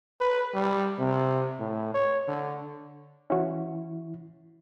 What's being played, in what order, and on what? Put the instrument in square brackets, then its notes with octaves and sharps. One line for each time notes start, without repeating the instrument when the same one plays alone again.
[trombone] B4
G3
C3
A2
C#5
D3
[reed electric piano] E3 E4 [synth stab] C#4 F#4